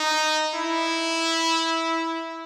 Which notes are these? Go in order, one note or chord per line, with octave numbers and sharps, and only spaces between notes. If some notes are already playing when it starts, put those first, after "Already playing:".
Already playing: D#4
E4